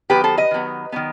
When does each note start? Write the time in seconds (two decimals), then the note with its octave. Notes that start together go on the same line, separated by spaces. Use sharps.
0.09 D#3 F#3 B3 G4 B4
0.24 A4 C5
0.37 B4 D#5
0.51 D#3 F#3 B3
0.92 D#3 F#3 B3